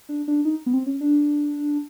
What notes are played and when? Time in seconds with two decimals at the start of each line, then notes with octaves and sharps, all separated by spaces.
0.09 D4
0.28 D4
0.45 D#4
0.66 B3
0.73 C4
0.86 C#4
1.01 D4